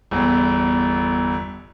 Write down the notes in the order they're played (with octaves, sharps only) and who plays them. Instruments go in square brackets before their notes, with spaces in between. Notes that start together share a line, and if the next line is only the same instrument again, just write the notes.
[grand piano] G1 E2